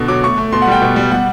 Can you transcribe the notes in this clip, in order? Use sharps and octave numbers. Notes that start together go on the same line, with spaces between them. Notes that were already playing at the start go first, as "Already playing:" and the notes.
Already playing: B2 D3
F#3 D6
A3 C#6
A3
B2 C6
F#5
G3 G5
B2
G3
G3 F#5